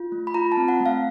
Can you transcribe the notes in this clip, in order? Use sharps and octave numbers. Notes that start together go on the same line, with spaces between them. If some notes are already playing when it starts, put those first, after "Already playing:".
Already playing: F4
A3
B5
F4 A#5
A5
C4
F#5
A3
F5